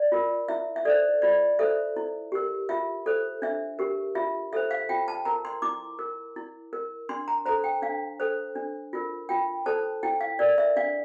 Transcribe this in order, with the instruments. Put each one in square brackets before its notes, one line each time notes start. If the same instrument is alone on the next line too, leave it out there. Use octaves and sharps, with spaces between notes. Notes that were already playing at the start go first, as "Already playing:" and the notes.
Already playing: [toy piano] D5
F4 A#4
E4 E5
E5
A4 C5 D5
F4 D5
A4 C5 E5
E4
G4 A#4
F4 E5
A4 C5
D4 E5
G4 A#4
F4 E5
A4 C5 E5
F5
F4 G5
A5
A#4 A#5
C6
E4 D6
A#4
E4
A#4
D4 C6
A#5
A4 C5 A#5
G5
D4 F5
A4 C5
D4
F4 A#4
F4 G5
A4 C5 A5
E4 G5
F5
A#4 D5
E5
D4 F5